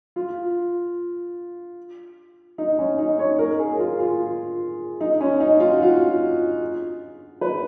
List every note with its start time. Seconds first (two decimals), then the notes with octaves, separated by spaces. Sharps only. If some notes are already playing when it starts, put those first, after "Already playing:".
0.16 F4
2.58 D#4
2.79 C#4
2.99 D#4
3.19 C#5
3.39 A#4
3.59 G#4
3.79 F4
3.99 F4
5.01 D#4
5.21 C#4
5.40 D#4
5.60 F4
5.72 F#4
5.82 F4
7.41 B4